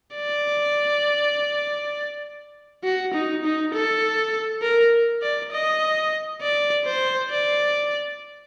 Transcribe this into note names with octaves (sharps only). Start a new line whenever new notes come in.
D5
F#4
D#4
D#4
A4
A#4
D5
D#5
D5
C5
D5